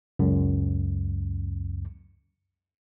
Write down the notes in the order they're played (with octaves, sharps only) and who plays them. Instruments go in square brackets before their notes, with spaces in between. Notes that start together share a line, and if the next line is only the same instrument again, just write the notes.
[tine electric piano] C#2 F#2